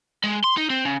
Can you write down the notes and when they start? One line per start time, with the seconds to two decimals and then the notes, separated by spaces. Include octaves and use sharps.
0.24 G#3
0.44 C6
0.57 D#4
0.70 C4
0.85 C#3